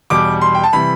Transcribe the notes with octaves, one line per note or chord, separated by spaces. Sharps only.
E2 B2 G3 D6
C6
G5
A5
C3 E3 G3 B5